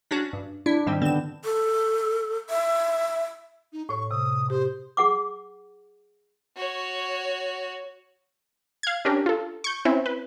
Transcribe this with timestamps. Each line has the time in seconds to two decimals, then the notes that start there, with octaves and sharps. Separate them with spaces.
0.11 C#4 D4 F#4
0.33 G2
0.66 D4 E4
0.86 G#2 D#3 G3 C4
1.02 D3 B3 C4 D4 E7
1.45 A4
2.50 E5
3.73 D#4
3.89 A2 C#5 C#6
4.11 C3 D#6
4.50 G4 C5
4.97 G#4 F#5 D6
6.57 F#4 C#5
8.83 F5 G#6
9.05 C#4 D4 G4 A#4
9.26 F4 A4
9.64 C#6 G6
9.85 C4 C#4 E4
10.06 B4